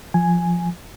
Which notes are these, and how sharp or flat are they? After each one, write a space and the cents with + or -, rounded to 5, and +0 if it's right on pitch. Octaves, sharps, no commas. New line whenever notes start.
F3 +0 G#5 +0